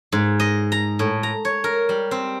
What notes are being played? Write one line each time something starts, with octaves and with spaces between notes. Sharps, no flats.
G#2
D#5
A#5
A2
A#5
C#5
A#4
G3
C4